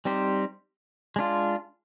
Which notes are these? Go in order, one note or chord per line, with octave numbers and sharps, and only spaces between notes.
G3 C4 D#4 G4 C5
G#3 D4 F4